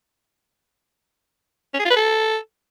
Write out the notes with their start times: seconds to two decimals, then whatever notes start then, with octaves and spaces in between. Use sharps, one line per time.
1.74 C#4
1.79 G#4
1.85 F4
1.90 B4
1.96 A4